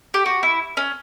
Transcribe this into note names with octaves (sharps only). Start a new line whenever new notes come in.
G4
F#4
E4
C#4